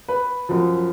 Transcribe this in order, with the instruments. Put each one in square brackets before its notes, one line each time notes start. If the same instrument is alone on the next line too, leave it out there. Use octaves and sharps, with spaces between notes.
[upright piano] B4
F#2 F3